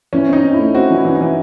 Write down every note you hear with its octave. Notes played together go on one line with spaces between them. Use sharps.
E3 C#4
C4 D#4
C4
A3 E4
C4 F#4
E3 E4
E3
D#4
E3